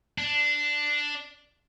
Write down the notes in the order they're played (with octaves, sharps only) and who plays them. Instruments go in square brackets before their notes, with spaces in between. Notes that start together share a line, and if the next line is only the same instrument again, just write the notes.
[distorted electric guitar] D4